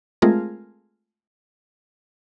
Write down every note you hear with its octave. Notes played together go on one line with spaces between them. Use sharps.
G#3 A3 C4 F4 G#4 A#4